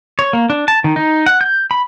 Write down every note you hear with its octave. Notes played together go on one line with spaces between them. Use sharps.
C#5
A#3
D4
A5
D#3
D#4
F#5
G6
B5